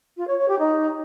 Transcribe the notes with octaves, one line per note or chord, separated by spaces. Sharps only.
F4
C#5
C#5
G4
D#4